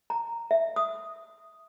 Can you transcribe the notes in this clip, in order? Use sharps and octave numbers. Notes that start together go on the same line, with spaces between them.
A#5
E5
D#6